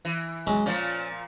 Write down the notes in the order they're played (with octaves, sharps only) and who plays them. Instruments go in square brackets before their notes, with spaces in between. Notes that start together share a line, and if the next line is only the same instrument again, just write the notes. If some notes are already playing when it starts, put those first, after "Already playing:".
[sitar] E3
[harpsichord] F#3 G#3 C#4
[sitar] A#2 F3 [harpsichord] C#4